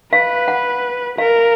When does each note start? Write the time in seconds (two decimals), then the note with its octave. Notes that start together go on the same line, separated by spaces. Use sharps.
0.12 B4 F5
0.48 F#5
1.18 A#4 F5